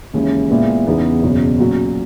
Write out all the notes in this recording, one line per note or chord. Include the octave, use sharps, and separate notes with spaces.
D#2 C#3 E3 G#3 C#4
A#2 G#3 B3 E4
E2 C#3 E3 B3 D#4
F#1 E2 B2 F#3 C#4
A#2 F#3 C#4 F#4